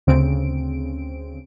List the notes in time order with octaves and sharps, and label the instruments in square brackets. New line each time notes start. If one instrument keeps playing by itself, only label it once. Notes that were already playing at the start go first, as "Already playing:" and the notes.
[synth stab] D2 C#3 C4 D7